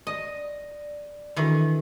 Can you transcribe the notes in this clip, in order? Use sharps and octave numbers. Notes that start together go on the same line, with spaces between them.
D5 D#5
D#3 E3 D4 F#4 A4